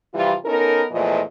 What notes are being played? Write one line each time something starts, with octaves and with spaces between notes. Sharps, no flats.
C3 E3 F3 G3 F4
B3 C#4 D#4 A4 A#4
E2 A#2 E3 F3 A3 D#5